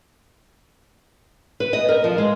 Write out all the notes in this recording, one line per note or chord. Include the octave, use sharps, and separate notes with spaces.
B4
D#5
A#4
F3
G#3